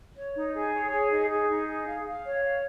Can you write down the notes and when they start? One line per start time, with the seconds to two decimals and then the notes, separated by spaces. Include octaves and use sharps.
0.17 C#5
0.36 D#4
0.54 G#4
0.74 C#5
0.91 G#4
1.10 D#4
1.29 G#4
1.48 D#4
1.67 G#4
1.86 F5
2.05 F5
2.24 C#5
2.43 F5